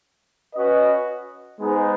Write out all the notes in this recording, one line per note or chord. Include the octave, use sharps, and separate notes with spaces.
C#4 F#4 B4 D#5
G#3 B3 D#4 G#4 C5